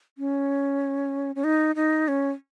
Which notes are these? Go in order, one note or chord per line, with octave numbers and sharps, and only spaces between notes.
C#4
C#4
D#4
D#4
C#4